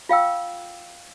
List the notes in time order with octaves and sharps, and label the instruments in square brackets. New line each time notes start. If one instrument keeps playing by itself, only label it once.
[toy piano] F4 F5 G5 E6